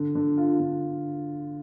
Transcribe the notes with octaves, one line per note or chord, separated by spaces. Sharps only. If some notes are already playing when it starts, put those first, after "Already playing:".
Already playing: D3
D3
F4
D3